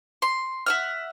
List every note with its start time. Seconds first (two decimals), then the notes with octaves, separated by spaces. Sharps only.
0.22 C6
0.66 E5 F#5 F6